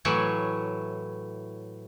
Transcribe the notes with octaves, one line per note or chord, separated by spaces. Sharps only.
A2 E3 F#3 C#5